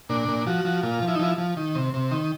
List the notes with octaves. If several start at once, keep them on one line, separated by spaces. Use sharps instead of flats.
A#2 D4
A#2
F3 F#4
F3
A#2 F4
F3
E4
D#4
F3 E4
F3
D#3
C3
C3
D#3